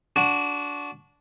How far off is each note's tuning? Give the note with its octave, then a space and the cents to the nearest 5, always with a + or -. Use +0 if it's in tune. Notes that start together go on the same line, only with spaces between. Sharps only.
D4 -20 F#4 -10